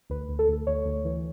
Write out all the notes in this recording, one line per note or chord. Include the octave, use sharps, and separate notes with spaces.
D2 B4
D2
A4
D2
D2 C#5
D2
E3